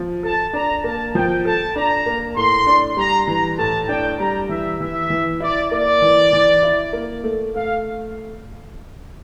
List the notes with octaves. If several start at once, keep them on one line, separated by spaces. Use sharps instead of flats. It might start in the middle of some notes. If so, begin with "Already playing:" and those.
Already playing: F3
A4 A5
D4 A#5
A#3 A5
F3 G5
A4 A5
D4 A#5
A#3
A2 C6
D4
G3 A#5
E3 A#5
A2 A5
D4 G5
G3 A#5
E3 E5
E3 E5
E3
E4 D5
A#3 D5
E3
E3
E4
A#3
A3
A3 F5